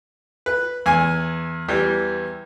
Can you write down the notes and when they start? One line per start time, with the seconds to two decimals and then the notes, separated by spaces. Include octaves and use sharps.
0.46 B4
0.86 E2 G#5
1.68 E2 E3 G3